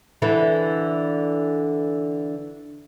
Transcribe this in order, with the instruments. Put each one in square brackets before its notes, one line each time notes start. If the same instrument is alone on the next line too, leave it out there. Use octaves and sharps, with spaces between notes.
[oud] D3 E3 E4